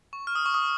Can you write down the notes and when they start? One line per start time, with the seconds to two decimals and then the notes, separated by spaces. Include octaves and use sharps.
0.13 C#6
0.27 F6
0.35 D#6
0.46 C#6
0.54 D#6